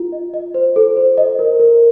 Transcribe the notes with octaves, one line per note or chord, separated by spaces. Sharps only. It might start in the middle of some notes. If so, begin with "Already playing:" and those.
Already playing: F4
D#5
D#5
C5
A4
C5
D#5
A#4
A#4